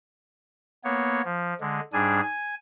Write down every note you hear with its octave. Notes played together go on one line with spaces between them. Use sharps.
A#3 B3 C#5
F3
D3 G#3
G#2 G3 D4 G#4 G#5
G#5